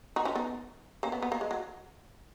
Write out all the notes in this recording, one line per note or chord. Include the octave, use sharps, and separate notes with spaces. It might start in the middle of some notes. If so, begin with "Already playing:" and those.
D#4 F#4
C#4 F4
B3 D#4
A#3 C#4
B3
B3
A#3
G#3
F#3